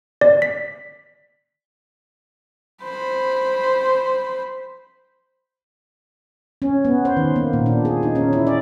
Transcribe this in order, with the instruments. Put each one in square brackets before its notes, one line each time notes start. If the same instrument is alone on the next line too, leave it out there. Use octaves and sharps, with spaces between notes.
[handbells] D5
B6
[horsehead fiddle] C5 B5
[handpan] C#4
B3
C5
D#3
A#3
A#2
D4
G#4
D#4
C#4
E4
D5